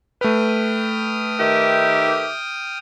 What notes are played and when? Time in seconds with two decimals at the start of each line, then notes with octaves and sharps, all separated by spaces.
0.21 A3 B4 G5 D#6 F6
1.39 D#3 G4 E5